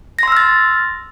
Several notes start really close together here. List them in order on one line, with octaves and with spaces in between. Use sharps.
A#6 C6 E6 F6 A6